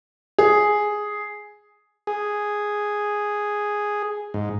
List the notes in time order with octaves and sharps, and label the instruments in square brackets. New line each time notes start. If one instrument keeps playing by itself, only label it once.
[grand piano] G#4
[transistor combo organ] G#4
G#2